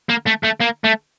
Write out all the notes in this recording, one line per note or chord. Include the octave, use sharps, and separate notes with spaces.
A#3
A3
A3
A#3
A3